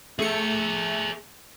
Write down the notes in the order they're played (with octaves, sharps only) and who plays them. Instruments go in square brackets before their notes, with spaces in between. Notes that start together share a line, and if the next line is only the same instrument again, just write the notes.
[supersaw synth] A3 C#7 [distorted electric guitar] G#4 E5